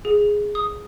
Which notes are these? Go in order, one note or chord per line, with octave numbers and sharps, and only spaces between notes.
G#4
D#6